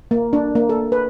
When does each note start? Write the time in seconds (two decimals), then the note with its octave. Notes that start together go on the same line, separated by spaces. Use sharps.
0.11 A#3
0.33 D4
0.55 A#3
0.69 A4
0.92 B4